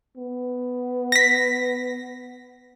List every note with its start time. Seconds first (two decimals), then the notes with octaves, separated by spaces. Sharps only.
0.17 B3
1.12 A#6 B6